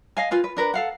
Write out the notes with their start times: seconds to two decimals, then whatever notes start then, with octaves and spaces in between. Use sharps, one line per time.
0.17 D#5 F5 G#5
0.31 F4 B4 G#5
0.44 B4
0.57 D4 A#4 B4
0.74 A4 F5 F#5